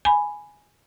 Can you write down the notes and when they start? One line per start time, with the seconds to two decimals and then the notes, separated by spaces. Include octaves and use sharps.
0.05 G#5 B5